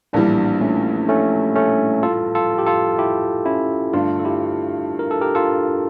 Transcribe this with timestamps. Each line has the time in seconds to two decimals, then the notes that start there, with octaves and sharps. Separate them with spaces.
0.13 A#1 A2 E3 G3 A#3 D4
0.61 A3 C#4
1.08 A3 C#4
1.56 A3 C#4
2.03 F4 A4
2.35 F4 A4
2.58 G4
2.66 F4 A4
2.98 E4 G4
3.45 C#4 E4
3.93 G2 D3 A3 D4 F4
4.19 A4
4.25 E4 G4
4.99 A#4
5.11 A4
5.21 G4 A#4
5.35 F4 A4